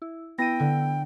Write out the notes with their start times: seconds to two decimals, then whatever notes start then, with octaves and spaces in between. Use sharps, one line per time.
0.02 E4
0.38 B3 E4 G5 A#6 D#7
0.60 D3